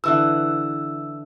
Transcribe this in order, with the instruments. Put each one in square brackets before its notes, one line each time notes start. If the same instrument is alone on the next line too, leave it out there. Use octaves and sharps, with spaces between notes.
[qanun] D3 E3 B4 [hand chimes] E6